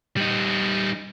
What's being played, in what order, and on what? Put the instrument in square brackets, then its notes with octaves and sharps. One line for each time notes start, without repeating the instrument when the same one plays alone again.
[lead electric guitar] G3 D#4